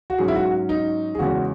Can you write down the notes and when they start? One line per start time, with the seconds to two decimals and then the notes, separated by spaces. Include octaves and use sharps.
0.10 F#4
0.18 G#2 F#3 C#4 G#4
0.28 E4
0.36 F#4
0.69 D#4
1.15 G#4
1.19 E2 C#3 G#3 C#4 F#4